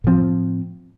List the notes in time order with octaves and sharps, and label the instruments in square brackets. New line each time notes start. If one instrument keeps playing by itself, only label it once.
[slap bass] A2 F3 C4